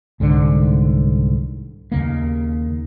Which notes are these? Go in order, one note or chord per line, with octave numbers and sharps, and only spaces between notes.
C2 G#2 D3 D#3
D#2 C#3 A#3